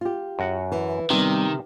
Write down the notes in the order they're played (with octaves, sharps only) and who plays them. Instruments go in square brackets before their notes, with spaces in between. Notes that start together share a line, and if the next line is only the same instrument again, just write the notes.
[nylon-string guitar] F4 G4
[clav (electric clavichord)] F#2 F#4 F#5
[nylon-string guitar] E3
[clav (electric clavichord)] C3 [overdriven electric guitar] D#3 [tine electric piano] G3 B3 C4 [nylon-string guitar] G4